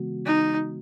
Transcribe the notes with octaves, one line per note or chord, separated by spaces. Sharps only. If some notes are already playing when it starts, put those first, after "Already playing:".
Already playing: C#3 E3 G#3 B3 F#4
D#4